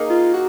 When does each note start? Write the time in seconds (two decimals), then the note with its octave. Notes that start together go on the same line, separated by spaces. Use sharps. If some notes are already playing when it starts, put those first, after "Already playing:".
Already playing: A#3 D#4 G#4 D#5
0.10 F4
0.34 F#4